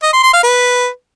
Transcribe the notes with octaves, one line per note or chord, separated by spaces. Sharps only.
D#5
C6
C6
F5
B4